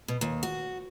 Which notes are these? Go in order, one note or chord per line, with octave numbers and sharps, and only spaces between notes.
B2
D#2
F#4